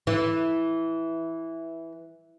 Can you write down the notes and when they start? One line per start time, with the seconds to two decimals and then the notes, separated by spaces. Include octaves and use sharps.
0.07 E3